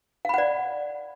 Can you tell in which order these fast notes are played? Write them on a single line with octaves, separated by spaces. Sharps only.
F5 B5 F#5 D5